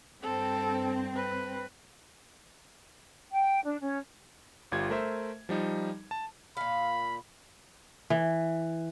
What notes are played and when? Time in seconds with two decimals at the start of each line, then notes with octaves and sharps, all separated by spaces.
0.23 G2 C4 A4
1.16 B4
3.33 G5
3.66 D4
3.81 C#4
4.72 G1 G3 F4 G#6
4.90 A3 A#4 C5 E5
5.49 F3 G3 D#4
6.11 A5
6.57 A#2 F5 B5
8.10 E3